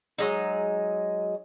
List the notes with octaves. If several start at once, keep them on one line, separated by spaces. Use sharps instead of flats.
F#3 G#3 D#4